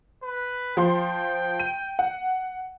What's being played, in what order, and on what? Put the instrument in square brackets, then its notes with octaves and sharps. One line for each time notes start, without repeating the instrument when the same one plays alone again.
[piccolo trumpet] B4
[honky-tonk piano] F3 C6 [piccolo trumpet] G5
[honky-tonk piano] D#7
F#5